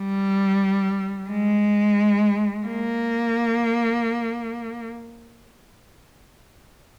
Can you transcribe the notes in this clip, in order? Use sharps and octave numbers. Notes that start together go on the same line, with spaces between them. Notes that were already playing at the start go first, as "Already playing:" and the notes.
Already playing: G3
G#3
A#3